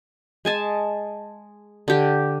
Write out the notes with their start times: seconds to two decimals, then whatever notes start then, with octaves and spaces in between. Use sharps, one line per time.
0.45 G#3 G#5 A5
1.88 D3 G4